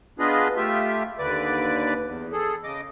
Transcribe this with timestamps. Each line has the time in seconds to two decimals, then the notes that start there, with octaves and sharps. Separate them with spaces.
0.19 B3 D4 F4 G#4 B4 D#5
0.57 A3 F4 G4 E5
1.19 D#2 D3 B4 D5 D6
2.06 E2
2.33 G#4 A4
2.64 C#3 D#5 D6